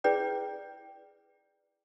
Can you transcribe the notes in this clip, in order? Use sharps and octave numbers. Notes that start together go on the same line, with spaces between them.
E4 G#4 B4 D5 G5